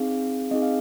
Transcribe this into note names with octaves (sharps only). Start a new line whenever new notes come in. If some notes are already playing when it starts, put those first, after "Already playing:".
Already playing: C4 D#4 G#4 F5
C4 D#4 G#4 D#5
F5